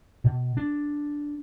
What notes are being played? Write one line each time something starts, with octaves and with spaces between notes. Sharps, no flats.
B2
D4